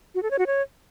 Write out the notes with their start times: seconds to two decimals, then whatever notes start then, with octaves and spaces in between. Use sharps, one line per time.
0.15 F#4
0.23 A4
0.31 C#5
0.39 F#4
0.47 C#5